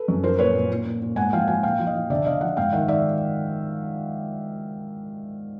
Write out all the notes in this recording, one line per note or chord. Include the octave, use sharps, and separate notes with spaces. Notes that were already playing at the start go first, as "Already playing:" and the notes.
Already playing: A4 B4
F#2
F3 A#4 C5
A#2 B4 C#5
A#2
A#2
A#2
A#2
G#2 F#5 G#5
F3 F5 G5
F3 F#5 G#5
A#2 F5 G5
F3
D#5 F5
F3
D3 D5 E5
D3 D#5 F5
F3 E5 F#5
G#2 F5 G5
D#3 E5 F#5
D#3 D5 E5